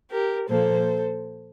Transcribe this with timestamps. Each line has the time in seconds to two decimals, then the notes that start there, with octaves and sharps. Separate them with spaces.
0.10 G4 A#4
0.48 A#2 F3 A#3 A4 C5